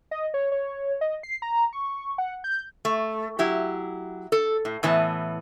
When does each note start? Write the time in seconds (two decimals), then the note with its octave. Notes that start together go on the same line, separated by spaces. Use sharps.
0.11 D#5
0.34 C#5
0.52 C#5
1.01 D#5
1.23 C7
1.42 A#5
1.73 C#6
2.18 F#5
2.44 G6
2.85 A3
3.39 F#3 E4 G4
4.32 A4
4.65 A2
4.83 A2 E3 B3 A5